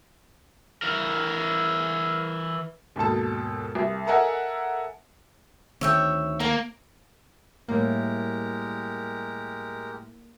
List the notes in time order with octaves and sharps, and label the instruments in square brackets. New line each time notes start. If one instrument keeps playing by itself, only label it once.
[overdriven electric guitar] E3 A#4
[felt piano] D#2 G#2 B2 A4 A5
C2
A4 A#4 D#5 E5 F#5 G#5
[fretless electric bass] D2 D#3 C4 [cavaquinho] C#5 E5 G5
[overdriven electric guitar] A#3 [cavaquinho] A#5
[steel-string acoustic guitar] A2 G3 [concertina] G#3 G4 A#4 [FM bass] A#3